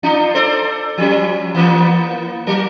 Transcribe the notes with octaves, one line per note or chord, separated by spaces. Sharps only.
D4 D#4 F4
A4 C5 D5
F3 G3 C#4
E3 A#3 B3
F#3 A#4